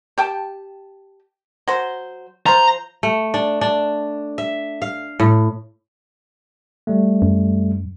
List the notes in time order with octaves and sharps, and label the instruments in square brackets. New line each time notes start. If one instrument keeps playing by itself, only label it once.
[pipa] G4 G5 A5
F#3 C5
[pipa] F3 C5 [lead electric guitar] A#5
[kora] A3
D4
D4
E5
F5
A2
[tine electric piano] G3 A3
[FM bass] F#2